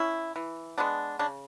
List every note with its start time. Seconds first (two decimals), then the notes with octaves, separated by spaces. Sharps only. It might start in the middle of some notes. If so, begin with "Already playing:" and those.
Already playing: C#4 E4
0.36 E3
0.78 G#3 B3 D4
1.19 C#3 D4